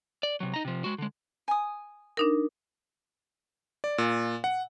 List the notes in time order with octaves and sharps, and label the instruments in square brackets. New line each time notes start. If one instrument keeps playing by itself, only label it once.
[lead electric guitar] D5
C3 F#3
D#4 A#5
C3 F3
G#3 F#4
D3 G#3
[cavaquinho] G#5 D#6
[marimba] D4 D#4 A#4
[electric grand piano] D5
A#2
F#5